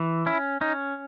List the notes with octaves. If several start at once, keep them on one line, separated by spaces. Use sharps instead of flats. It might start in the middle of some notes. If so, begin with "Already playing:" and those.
Already playing: E3
C#4 E4
C#4 D#4